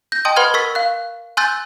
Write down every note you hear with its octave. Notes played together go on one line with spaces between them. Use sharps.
G6 A#6
D#5 G5 A5 C6 D#6
B4 F#5 B5 C6 F6 G#6
A#4 C#6 E6 A6 B6
F5 F#6
G#5 C6 E6 F#6 G6 A6